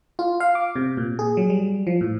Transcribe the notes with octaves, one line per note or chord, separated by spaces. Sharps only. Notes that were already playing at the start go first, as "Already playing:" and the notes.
F4
F5
D6
C3
A#2
G#4
F#3
G3
F3
A2